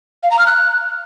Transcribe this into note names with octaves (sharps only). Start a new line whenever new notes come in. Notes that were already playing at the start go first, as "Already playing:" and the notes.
F5
A#5
F6
F#6